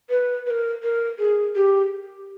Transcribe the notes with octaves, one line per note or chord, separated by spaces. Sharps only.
B4
B4
A#4
A#4
G#4
G4